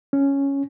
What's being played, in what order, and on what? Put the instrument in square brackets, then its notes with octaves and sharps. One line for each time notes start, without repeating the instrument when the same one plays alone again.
[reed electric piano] C#4